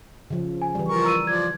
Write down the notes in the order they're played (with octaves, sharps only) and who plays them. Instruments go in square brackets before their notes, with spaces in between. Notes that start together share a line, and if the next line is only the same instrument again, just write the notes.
[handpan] C#3 F3
[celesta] G#5
[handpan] E3 G3
[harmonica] F3 A#4 C#6
[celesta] A#5 E6 D#7
[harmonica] F3 D5 [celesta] G#6